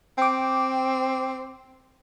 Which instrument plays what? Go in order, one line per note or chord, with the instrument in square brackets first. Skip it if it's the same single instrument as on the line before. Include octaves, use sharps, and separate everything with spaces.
[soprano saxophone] C4 [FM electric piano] G5 D6